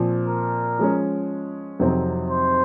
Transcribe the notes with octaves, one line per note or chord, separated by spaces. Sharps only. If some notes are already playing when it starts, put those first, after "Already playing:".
Already playing: A#2 F3 C4
A#4
F3 G#3 C#4
F2 C3 F#3 C4 D#4
C5